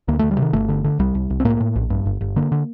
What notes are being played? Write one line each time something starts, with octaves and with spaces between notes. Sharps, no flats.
D2 A#3
D2 A3
G3
C3 D#3
G1 A3
D3
D3
C2 G3
C2
C2
C4
A2 A#3
A2
A#1
G2
G1
G1
D3 A#3
D3